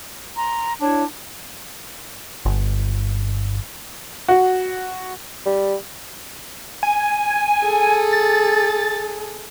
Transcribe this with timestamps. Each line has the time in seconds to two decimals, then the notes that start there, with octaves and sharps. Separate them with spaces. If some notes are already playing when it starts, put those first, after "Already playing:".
0.36 A#5 C6
0.81 D4 E4 C#5 G#6
2.45 G1
4.28 F#4
5.46 G3
6.83 G#5
7.62 G#4 A4
8.13 A6